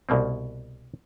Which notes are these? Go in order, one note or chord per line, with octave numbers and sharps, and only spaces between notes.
C2 B2 A#3 C4